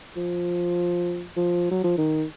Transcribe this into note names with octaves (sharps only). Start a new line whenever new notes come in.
F3
F3
F#3
F3
D#3